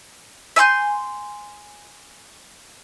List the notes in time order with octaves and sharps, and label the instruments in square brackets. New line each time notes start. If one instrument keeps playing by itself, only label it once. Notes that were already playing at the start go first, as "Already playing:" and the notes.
[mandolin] E5 G#5 C6 G6